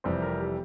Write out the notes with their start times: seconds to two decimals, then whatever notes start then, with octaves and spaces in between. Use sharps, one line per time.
0.04 F1 F2 C3 E3 G3 C4
0.22 A#4
0.41 G4